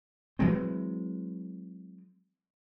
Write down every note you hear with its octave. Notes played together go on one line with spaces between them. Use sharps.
E3 F#3 G#3 C4